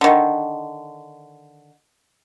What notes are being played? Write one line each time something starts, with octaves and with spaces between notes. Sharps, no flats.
D3 D#3